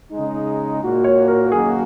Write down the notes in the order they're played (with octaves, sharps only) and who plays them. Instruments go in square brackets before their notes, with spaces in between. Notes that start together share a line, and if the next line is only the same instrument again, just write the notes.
[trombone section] C#3 G#3 D#4
A#2 A#3 F#4
[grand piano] C#5
A#4
[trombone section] F#2 D#3 A#3 D#4 F#4 [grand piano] G#4